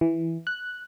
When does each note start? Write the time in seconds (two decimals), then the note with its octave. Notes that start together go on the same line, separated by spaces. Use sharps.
0.01 E3
0.47 F#6